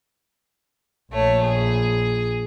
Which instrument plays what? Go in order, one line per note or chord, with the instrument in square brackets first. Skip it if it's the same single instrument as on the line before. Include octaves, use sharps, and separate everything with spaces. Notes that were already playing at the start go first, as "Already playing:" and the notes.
[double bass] A#1 [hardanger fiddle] A3 C#5
[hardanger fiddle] G#4